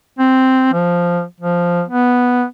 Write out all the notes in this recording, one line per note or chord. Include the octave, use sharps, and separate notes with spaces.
C4
F3
F3
B3